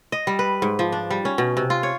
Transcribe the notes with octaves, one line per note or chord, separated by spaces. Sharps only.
D#5
G3
B4
G#2
F3
D4
G3
C#4
B2
C3
F4
C#5